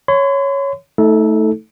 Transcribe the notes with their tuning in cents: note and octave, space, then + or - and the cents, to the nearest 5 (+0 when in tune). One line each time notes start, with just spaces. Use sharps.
C#5 +0 C6 -45
A3 +0 D#4 +35 A4 -10